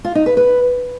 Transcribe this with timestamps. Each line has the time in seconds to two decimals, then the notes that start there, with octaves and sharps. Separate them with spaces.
0.05 F4
0.15 D#4
0.26 B4
0.37 B4